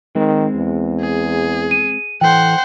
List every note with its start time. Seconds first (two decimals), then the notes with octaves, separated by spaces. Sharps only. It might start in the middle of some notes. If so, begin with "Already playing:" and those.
0.16 D#3 G#3 C4
0.55 E2
1.01 G#4
1.71 D#7
2.21 E3 A4 C5 F#5 G5